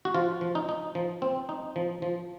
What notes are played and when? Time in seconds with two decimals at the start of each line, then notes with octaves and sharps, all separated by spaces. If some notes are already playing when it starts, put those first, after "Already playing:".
0.05 F#4
0.15 F3 F4
0.41 F3
0.55 D#4
0.69 D#4
0.95 F3
1.22 C4
1.49 D#4
1.76 F3
2.02 F3